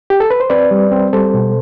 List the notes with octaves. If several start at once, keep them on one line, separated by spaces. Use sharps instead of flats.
G4
A4
B4
C5
C4 B4 D5
G3
C4
G3 A4 C5
B2